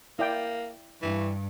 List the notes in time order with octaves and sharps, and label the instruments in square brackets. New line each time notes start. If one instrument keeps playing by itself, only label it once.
[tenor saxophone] A#3 [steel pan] E4 D5 G5
[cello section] G2 [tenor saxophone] E3